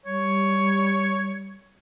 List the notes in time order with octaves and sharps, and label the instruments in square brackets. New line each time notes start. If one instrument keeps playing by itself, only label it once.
[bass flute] G3 [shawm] C#5